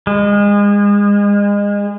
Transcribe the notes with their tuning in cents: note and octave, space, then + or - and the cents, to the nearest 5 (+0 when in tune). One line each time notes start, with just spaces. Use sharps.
G#3 -30